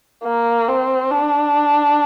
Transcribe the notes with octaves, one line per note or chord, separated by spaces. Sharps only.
A#3
C4
D4